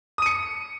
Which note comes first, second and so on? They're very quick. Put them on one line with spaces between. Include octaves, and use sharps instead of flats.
D#6 D#7 C#7